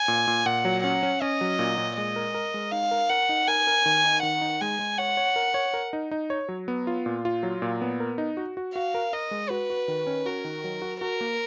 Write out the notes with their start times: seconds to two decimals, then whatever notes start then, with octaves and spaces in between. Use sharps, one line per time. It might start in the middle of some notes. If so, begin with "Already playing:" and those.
Already playing: G#5
0.08 A#2
0.28 A#2
0.46 A#2 F#5
0.65 F#3
0.84 C#4 F#5
1.03 C#4
1.22 C#4 D#5
1.41 F#3
1.59 A#2
1.78 A#2
1.97 G#3 D#5
2.16 A#4
2.35 A#4
2.54 G#3
2.72 D#4 F5
2.91 A#4
3.10 A#4 F#5
3.29 D#4
3.48 A#4 G#5
3.67 A#4
3.86 D#3
4.04 D#4
4.23 D#3 F#5
4.41 D#4
4.61 G#3 G#5
4.79 G#3
4.98 C#5 F#5
5.17 C#5
5.36 A#4
5.54 C#5
5.74 A#4
5.93 D#4
6.11 D#4
6.30 C#5
6.49 F#3
6.68 B3
6.87 F4
7.06 A#2
7.25 F4
7.43 F#3
7.62 A#2
7.81 B3
8.00 A#4
8.18 D#4
8.37 F#4
8.57 F#4
8.75 F#4 F5
8.94 A#4
9.13 A#4 D#5
9.31 G#3
9.50 F#4 B4
9.70 F#4
9.88 D#3
10.07 C#4
10.26 F#4 A#4
10.44 D#3
10.64 F#3
10.82 F#4
11.01 F#4 A#4
11.21 A#3